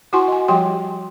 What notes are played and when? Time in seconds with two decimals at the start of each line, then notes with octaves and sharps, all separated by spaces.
0.13 E4 F#4 F#5 G#5 C6 C#6
0.28 D#5 G#5
0.48 F3 G3 G4 G5 C6